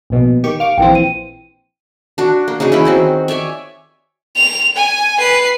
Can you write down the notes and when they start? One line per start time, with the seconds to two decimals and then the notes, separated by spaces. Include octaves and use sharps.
0.10 A#1 B2
0.44 D#3 G4 C#6
0.60 F5 C#6 D6 F6
0.78 A#1 E3 C4 G5
0.95 D#7
2.18 D4 F#4
2.48 A#3
2.60 C#3 D#4 F#4 G#4
2.72 C#3 E3 E4 B5
2.85 D#3 C4 F#4
3.28 C#5 D5 E5 G#5
4.36 F7
4.76 G#5
5.19 B4 C7